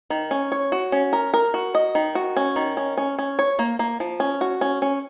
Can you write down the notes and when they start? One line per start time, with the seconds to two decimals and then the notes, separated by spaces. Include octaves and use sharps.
0.10 D#3
0.31 C#4
0.52 C#5
0.72 F#4
0.92 C#4
1.13 A#4
1.34 A#4
1.54 F#4
1.75 D#5
1.95 D#3
2.15 F#4
2.36 C#4
2.56 D#3
2.77 C#4
2.97 C#4
3.18 C#4
3.39 C#5
3.59 A#3
3.79 A#3
4.00 F3
4.20 C#4
4.41 F#4
4.61 C#4
4.82 C#4